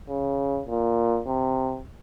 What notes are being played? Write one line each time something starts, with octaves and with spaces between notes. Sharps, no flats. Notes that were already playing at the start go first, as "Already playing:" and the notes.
C#3
A#2
C3